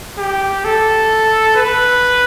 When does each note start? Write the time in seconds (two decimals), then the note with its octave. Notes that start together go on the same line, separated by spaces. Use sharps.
0.19 G4
0.64 A4
1.56 B4